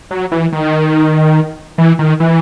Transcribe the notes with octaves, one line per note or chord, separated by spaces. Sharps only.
F#3
E3
D#3
E3
D#3
E3